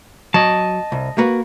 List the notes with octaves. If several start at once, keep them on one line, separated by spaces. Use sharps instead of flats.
F#3 D#5 A5
C2
A#3 F#4 B4